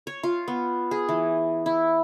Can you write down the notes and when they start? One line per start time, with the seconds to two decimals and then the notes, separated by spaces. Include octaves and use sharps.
0.07 C#5
0.23 F4
0.48 B3
0.91 G#4
1.09 E3
1.66 E4